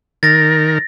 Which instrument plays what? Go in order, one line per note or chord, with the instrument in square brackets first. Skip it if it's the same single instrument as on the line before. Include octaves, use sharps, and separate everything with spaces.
[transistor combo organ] D#3 A#4 [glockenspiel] A6 A#6